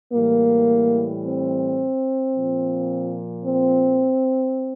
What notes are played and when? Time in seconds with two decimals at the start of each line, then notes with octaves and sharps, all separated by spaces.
0.13 A2 E3 G3 A#3
1.24 C4
2.34 A#2 F3
3.44 C4